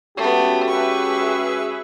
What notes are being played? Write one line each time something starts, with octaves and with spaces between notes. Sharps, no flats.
G#3 A3 B3 C#4 F#4 G4
G#4 B4 E5 C#6